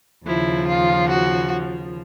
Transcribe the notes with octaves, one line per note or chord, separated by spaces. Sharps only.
D#2 C#3 F3 E4
F4
F#4